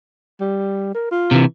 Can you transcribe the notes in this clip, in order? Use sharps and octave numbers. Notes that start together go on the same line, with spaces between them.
G3
A#4
F4
C3 E3